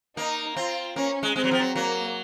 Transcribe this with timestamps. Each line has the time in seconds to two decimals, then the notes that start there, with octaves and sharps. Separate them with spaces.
0.17 A#3 D#4
0.56 C4 F4
0.96 A#3 C#4
1.23 G#3
1.36 G#3 C4
1.44 F#3
1.51 F3
1.59 F#3
1.76 F#3 A#3